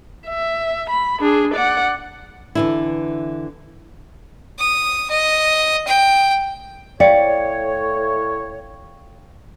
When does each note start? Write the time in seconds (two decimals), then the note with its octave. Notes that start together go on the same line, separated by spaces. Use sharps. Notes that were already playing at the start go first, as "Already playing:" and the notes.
0.28 E5
0.90 B5
1.20 D4 G#4
1.54 D5 F#5
2.55 D3 E3 E4
4.59 D#6
5.10 D#5
5.87 G5
7.00 A2 C#5 D5 F5 G5 C#7